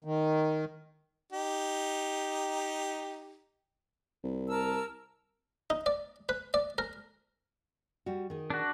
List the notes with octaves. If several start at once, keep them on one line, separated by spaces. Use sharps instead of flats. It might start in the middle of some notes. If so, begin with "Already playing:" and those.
D#3
D#4 G4
C2
A#4 A5 E6
D#4
D5
B4
D5
A#4
G3 F#4
D#3 G#4
D4 F#4